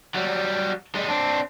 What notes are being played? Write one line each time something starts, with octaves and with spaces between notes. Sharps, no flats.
F#3 G3
G3 G#3
C4 D4